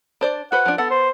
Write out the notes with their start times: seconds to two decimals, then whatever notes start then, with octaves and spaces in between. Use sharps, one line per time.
0.21 D4 C5 D5
0.52 F#4 B4 C5 F#5
0.66 F3 D4
0.78 B3 A4 F#5
0.91 C5